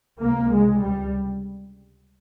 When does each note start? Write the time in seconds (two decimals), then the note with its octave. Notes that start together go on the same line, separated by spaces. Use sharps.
0.21 C#2 C3 A#3
0.51 C#2 C3 G#3
0.81 C#2 C3 G3